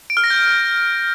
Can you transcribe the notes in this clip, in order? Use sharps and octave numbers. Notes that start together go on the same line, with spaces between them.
D7
F6
A#6
G6